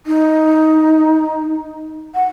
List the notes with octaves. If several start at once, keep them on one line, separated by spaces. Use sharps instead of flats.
D#4
F#5